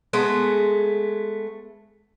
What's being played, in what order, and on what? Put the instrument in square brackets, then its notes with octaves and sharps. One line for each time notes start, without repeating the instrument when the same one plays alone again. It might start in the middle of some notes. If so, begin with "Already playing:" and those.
[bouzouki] G#3 A3 B3